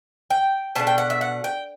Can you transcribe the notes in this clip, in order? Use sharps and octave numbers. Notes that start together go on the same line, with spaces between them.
G5
B2 A3 D4 A5
G5
F#5
E5
F#5
G5